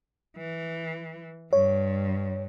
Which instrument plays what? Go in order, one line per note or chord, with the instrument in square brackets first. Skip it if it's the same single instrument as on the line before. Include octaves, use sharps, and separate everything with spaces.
[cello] E3
[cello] G2 [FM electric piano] C#5